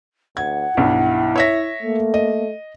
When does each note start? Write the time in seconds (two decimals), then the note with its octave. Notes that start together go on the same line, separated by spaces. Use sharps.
0.37 D2 F#5 G#6
0.77 B1 G2 E4
1.36 C#5 E5 A#6
1.83 A3 A#3
2.14 D#5